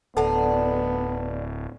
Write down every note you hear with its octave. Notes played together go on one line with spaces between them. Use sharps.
D1 B3 D4 D#4 A4 F#5 A5